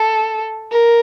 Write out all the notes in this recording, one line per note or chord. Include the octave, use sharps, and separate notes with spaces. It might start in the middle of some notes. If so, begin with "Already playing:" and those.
Already playing: A4
A#4